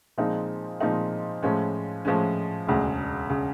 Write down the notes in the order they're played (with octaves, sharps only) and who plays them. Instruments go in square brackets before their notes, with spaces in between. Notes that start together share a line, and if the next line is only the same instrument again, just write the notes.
[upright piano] A#2 F3 G#3 C4 D#4
A#2 F3 G#3 C4 D#4
A2 F3 G#3 C#4
A2 F3 G#3 C#4
E1 D2 C#3
C#3